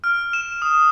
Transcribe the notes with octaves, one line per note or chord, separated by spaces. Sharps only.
F6
E7
D#6